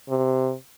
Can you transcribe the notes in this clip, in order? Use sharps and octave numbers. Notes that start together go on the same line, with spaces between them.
C3